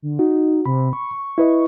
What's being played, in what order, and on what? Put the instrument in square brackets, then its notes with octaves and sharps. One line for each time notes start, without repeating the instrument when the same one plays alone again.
[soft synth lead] D3
[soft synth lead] D#4 [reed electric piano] F#4
[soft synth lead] C3 [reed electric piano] B5
[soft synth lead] C#6
[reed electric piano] E4 B4 D#5